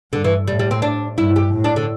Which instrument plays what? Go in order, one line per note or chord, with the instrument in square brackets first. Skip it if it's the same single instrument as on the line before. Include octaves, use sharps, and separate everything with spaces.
[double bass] G2 [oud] D3
[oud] E3
[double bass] A2 [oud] G3
[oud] G3
C4
D4
[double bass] G2 [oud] E4
[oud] G4
[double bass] A2
[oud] D4
D3